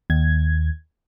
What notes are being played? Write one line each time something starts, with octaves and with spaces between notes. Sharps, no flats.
D#2 G#6